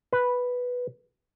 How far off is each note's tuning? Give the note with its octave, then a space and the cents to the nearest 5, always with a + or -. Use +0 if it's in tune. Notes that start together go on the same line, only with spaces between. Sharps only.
B4 +0